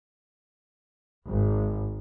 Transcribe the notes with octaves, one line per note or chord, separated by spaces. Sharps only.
G#1